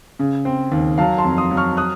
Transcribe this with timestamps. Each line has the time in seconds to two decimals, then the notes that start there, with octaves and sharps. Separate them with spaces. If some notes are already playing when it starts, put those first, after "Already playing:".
0.19 C#3
0.45 C4
0.72 D#2
0.98 F#3 F5 A5
1.18 A5 C6
1.25 F2
1.38 C6 D#6
1.51 F#3
1.57 C#6 F6
1.77 D#6 F#6